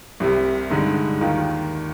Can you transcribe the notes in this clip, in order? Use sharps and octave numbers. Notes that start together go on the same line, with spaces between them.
C2 C3 G3
G2 D3 G#3 D#4
D#2 D#3 A#3 F4